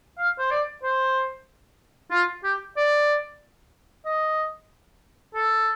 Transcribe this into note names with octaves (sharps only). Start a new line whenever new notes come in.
F5
C5
D5
C5
F4
G4
D5
D#5
A4